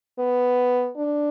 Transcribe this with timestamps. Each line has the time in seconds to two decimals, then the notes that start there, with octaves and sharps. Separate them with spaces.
0.19 B3
0.97 D4